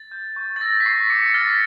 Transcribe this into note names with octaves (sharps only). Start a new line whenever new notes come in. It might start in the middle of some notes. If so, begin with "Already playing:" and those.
Already playing: A6
G6
C#6
A6
E6 A#6
B6
C#6 C7
D6 C#7
C#7
F6 A6
B6